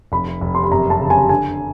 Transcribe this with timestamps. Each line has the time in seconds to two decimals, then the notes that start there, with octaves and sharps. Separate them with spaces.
0.12 F1 B5
0.41 F1
0.55 C6
0.64 B5
0.71 F#2 A#5
0.90 A5
1.00 C#3
1.10 G#5
1.29 D3 G#5